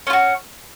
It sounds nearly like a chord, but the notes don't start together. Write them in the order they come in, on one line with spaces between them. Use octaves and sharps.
C#4 F4 F#4